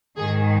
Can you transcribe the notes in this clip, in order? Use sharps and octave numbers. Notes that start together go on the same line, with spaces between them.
G#2 D#3 G#4